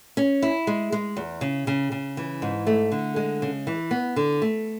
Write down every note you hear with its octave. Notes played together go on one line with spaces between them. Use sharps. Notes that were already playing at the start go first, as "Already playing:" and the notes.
C#4
E4
G#3
G#3
E2
C#3
C#3
C#3
E3
G#2
A3
D3
G#3
C#3
E3
B3
D3
A3